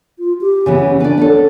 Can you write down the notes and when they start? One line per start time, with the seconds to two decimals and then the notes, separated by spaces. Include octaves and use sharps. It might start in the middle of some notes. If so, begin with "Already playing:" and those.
0.19 F4
0.41 G4
0.66 C#3 E3 B3
0.80 C#4
1.00 D4 B4 D5
1.18 B3 C#4 A4